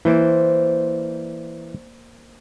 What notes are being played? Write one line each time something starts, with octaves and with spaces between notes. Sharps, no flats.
E3 A#3 C5 D5